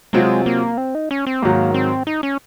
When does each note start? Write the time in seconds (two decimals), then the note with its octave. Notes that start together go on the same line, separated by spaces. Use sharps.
0.13 C3 F#3 G#3 C4 F4
0.46 A#3
0.77 C4
0.95 D#4
1.11 C#4
1.27 C4
1.42 G#2 D#3 F#3 A#3
1.74 C4
2.07 D#4
2.23 C#4